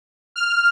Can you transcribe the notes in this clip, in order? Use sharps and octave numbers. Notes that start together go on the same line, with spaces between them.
F6